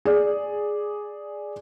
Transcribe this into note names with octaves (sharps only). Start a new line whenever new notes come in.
G#4 D5